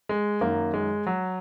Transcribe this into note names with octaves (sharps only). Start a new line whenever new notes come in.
G#3
F#2 D#3 A#3
G#3
F#3